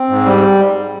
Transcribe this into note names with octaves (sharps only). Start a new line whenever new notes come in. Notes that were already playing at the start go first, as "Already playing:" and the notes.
Already playing: C4
G#2
G3